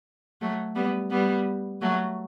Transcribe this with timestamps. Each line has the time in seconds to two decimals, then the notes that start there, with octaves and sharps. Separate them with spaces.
0.41 F#3 A3
0.75 G3 B3
1.10 G3 B3
1.81 F#3 A3